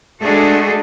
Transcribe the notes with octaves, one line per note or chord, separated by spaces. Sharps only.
G#3 A3 D4 F#4 G#4 A4